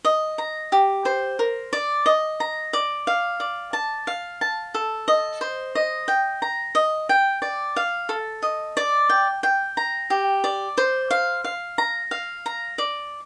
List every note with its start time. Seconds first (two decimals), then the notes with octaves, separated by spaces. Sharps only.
0.05 D#5
0.38 A#5
0.72 G4
1.05 C5
1.39 A#4
1.73 D5
2.06 D#5
2.40 A#5
2.73 D5
3.07 F5
3.40 D5
3.73 A5
4.07 F5
4.41 A5
4.74 A4
5.08 D#5
5.41 C5
5.75 D#5
6.08 G5
6.42 A#5
6.75 D#5
7.09 G5
7.42 D5
7.76 F5
8.09 A4
8.42 D#5
8.77 D5
9.09 G5
9.43 G5
9.77 A#5
10.10 G4
10.44 D5
10.78 C5
11.11 F5
11.44 F5
11.78 A#5
12.11 F5
12.46 A#5
12.78 D5